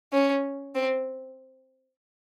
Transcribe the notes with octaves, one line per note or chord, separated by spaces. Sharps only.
C#4
C4